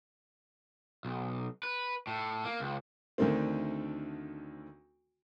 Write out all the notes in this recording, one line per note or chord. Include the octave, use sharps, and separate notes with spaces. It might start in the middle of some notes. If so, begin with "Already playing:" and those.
B1
B4
A2
A#3
C#2
D2 D3 D#3 A3 C4